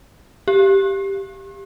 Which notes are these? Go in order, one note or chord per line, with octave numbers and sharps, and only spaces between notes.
G4